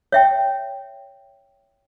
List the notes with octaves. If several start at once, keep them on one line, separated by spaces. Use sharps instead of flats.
C#5 E5 G5